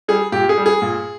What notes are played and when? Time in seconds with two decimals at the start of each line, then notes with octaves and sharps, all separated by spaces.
0.08 G3 G#4
0.32 A#2 G4
0.49 G#4
0.58 G3
0.66 G#4
0.82 A#2